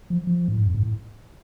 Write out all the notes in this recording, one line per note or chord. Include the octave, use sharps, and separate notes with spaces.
F3
F3
A2
G#2
F2
G#2
A2